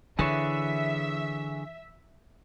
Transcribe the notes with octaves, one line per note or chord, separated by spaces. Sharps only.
D3 E3 G#4 B4 C#5 E5